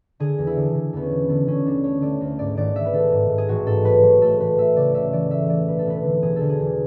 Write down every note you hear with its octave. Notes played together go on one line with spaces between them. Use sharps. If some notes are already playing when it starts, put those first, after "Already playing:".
D3 G#4
E2
E4
D3
D3
E2 B3
C#4
E1
D3 B3
D3 C#4
D2 D4
A3 C#5
A3 D5
D2
G#2 D5
G#1 D5
G#1 E5
B4
G#1 A4
G#2
G#2
G#4
A1 F#4
G#2 A4
F#3 B4
F#3
A3 A4
A1 B4
A3 E5
C#3 D5
C#2 E5
E3 D5
A3 E5
E3 D5
E1 B4
A4
E1 B4
D3
E1 G#4
D3 A4
G#4
E2